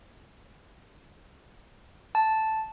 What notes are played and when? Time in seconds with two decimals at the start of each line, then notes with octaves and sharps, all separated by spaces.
2.15 A5